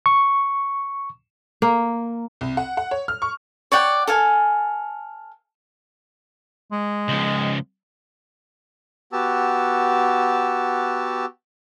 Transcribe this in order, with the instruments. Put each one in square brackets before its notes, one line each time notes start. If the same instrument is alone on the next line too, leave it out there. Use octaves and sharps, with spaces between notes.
[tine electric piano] C#6
[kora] A#3
[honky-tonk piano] C2
F#5
F#5
C#5
F6
C#6
[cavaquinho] C#5 D5 F#5 G5
A4 F5 G#5
[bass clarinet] G#3
[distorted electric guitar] C#2 F3
[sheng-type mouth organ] B3 F#4 G4 A5 E6